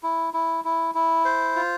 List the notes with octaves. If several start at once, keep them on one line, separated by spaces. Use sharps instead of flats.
E4
E4
E4
E4
C5
F4